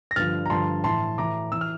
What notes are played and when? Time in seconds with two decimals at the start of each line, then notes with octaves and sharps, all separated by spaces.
0.11 A#6
0.16 G2 D3 F3 F6 A6
0.46 A#5
0.50 G2 D3 F3 A5 C6
0.84 A2 E3 A5 C6
1.18 A2 E3 A#5 D6
1.52 E3 E6
1.61 F6